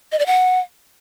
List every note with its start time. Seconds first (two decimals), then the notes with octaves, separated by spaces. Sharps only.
0.12 D#5
0.19 D5
0.26 F#5